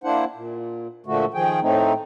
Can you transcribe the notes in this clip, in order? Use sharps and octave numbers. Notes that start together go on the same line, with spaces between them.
A#3 D4 E4 C5 F#5
A#2
A#2 D3 F3 A3 F#4
D#3 F3 G#4 G5
A2 A3 C4 D#4